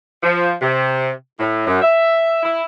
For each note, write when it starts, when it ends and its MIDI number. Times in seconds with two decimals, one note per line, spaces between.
0.23 0.53 53
0.62 1.10 48
1.40 1.65 45
1.67 1.80 42
1.82 2.43 76
2.43 2.65 64